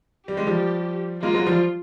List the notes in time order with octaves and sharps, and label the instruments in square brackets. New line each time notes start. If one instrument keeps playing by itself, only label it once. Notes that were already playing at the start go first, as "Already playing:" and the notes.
[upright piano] G3 [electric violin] G4
[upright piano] G#3
F3 G3
[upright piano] G#3 A#3 [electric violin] F4
[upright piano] F#3 G#3
F3 G3